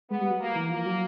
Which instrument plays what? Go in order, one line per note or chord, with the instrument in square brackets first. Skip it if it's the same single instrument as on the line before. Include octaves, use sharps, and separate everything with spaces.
[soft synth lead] G#3 [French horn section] B3
[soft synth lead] G3
F#3
[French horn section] A#3
[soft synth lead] E3
[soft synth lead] F3 [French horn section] A#3
[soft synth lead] F#3